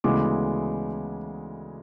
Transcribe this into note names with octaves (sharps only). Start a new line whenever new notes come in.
D2 C#3 E3 G#3 B3 D6